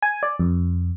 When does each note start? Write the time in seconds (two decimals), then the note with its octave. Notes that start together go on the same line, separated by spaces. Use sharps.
0.02 G#5
0.23 D5
0.39 F2